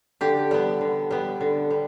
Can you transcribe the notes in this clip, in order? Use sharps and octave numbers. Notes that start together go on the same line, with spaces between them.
D3 G4
G3 B3
D3
G3 B3
D3
G3